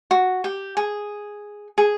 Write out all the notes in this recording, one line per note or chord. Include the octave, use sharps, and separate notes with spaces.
F#4
G4
G#4
G#4